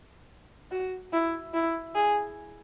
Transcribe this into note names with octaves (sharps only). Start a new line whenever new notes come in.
F#4
E4
E4
G#4